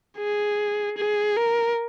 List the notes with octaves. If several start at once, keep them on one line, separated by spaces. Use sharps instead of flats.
G#4
G#4
A#4